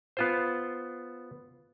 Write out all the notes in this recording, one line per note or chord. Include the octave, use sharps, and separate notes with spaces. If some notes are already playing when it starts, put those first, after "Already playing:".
B3 F4 C5